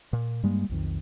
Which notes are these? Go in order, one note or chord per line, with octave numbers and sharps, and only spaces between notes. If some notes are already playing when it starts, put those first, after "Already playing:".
A#2
G2 G3 G#3 A#3
B1 F2 D#3